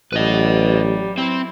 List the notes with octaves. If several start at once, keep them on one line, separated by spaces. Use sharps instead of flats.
A1 F#3 G3 B4 D#5
F#3 C4 E4